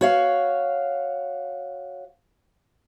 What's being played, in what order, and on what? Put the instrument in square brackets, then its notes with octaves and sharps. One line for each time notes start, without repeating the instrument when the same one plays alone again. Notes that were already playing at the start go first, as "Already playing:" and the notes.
[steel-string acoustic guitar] F#4 C#5 F5